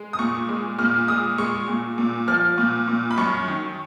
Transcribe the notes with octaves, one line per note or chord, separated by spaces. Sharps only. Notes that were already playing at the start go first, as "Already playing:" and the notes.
Already playing: G#3
D#6
A#2 C#6
G#3
A#2 F6
G#3 D#6
G#3 C#6
A#2
A#2
F3 F6
A#2
A#2
B5
F#2 C#6
D#3